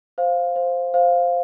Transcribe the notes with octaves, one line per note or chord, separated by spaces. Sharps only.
C5 F5
C5
C5 F5